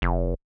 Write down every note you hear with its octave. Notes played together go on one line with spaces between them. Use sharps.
F1